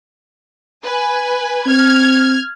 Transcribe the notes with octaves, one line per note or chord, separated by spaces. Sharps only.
B4 G#5
C4 F6 G#6